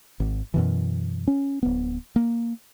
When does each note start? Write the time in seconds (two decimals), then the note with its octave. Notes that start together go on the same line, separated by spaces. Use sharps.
0.20 G#1
0.54 F#2 B2 E3
1.27 C#4
1.63 D1 B3
2.16 A#3